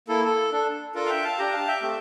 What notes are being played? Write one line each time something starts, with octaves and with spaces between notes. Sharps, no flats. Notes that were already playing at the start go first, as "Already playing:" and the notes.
A#3 E4 A4
A4
D4 A4
D4 F4 A4 A#4
F5
E5 G5
F5 A5
D4 G4 G5 A#5
F5 A5
E5 G5
A3 C4 G4